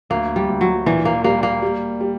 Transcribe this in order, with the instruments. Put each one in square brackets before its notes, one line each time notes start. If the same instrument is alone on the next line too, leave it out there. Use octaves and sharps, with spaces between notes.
[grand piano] D2 [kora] A#3
[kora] G3
[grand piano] D2
[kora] F#3
[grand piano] A#2 [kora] E3
[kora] A#3
[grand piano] G3 [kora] A#3
[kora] A#3
[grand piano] G3
G3